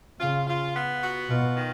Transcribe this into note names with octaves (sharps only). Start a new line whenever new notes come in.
C#3 F4
F4
B3
F#4
B2 F4
D#3